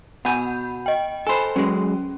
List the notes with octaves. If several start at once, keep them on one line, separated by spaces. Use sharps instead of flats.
B2 F#5 G#5 B5 G6
D#5 G5
A4 C5 G#5 B5
F#3 G#3 C#4